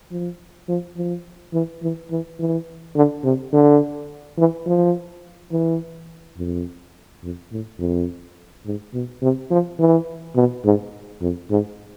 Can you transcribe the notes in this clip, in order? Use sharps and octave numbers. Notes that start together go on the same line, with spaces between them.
F3
F3
F3
E3
E3
E3
E3
D3
C3
D3
E3
F3
E3
F2
F2
A2
F2
G#2
B2
C3
F3
E3
B2
G#2
F2
G#2